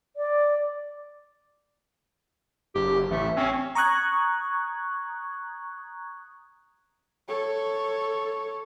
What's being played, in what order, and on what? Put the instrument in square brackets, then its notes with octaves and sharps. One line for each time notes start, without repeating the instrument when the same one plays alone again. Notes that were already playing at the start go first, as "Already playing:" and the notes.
[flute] D5
[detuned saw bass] F#1 [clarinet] G4
[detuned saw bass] A1 [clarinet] A3
[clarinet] C4 [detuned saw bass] C#4
[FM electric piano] A#5 C#6 D#6 F#6 G#6
[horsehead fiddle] A4 C#5